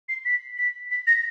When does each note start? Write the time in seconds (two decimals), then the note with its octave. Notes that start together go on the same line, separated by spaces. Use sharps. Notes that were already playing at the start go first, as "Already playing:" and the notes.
0.09 C7
0.25 B6
0.58 B6
0.91 B6
1.07 A#6